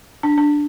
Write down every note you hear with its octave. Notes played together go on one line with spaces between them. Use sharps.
D4
D4